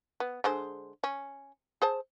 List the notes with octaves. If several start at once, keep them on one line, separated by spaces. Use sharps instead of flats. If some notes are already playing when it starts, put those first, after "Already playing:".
B3
D3 G#3 C5
C#4
G#4 C5 A5